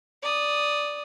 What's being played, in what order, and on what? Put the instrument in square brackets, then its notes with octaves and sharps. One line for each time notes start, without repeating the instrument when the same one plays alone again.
[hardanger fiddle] D5 D#6